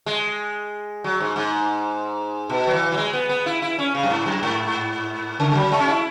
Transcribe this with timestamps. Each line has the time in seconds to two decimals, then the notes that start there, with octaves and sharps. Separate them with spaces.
0.06 G#3
1.04 F#3
1.20 G#2
1.36 G#2
2.50 B2
2.67 F#3
2.73 E3
2.92 F#3
2.97 G#3
3.13 B3
3.29 B3
3.46 E4
3.62 E4
3.79 C#4
3.95 C#3
4.03 F#2
4.10 G#2
4.26 F#2
4.43 G#2
5.40 C#3
5.51 G#3
5.55 F#3
5.72 G#3
5.80 C#4
5.88 E4